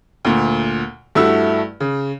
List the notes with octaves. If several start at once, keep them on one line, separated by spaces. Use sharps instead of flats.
D2 A#2
G2 A3 E4 F#4 E6
C#3